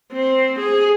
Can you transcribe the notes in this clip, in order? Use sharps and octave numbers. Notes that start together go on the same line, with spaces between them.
C4
G#4